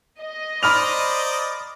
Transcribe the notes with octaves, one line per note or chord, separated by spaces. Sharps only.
D#5
C5 D5 A#5 B5 D#6 F6 F7